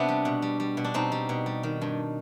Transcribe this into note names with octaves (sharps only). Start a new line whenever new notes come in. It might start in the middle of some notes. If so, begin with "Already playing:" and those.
Already playing: C3 B3 D4
G3
B2
G3
G3
B2
D4
B2 C4 D#4
G3
B2
G3
D#3
G2